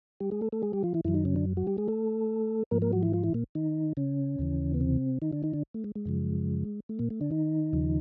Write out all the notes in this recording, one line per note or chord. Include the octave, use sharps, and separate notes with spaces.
G3 G4
G#3 G#4
A3 A4
A3 A4
G#3 G#4
G3 G4
F3 F4
E3 E4
F#2 D#3 E3 F#3 E4
D#3 D#4
C#3 C#4
D3 D4
F#3 F#4
G3 G4
G#3 G#4
A3 A4
G#2 F3 A#3 A#4
A#3 A#4
F#3 F#4
E3 E4
F3 F4
E3 E4
A#2 A#3
D#3 D#4
C#3 C#4
D#2 C#3 E3
B3
C3 C4
D#3 D#4
D3 D4
D#3 D#4
D3 D4
A3
G#3
G#3
F#2 C#3 F3
A3
A#2 A#3
A3
D3 D4
D#3 D#4
D#2 C#3 F3